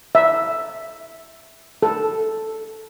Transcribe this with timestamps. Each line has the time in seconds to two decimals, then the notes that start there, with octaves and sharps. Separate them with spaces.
0.15 E5
1.83 A4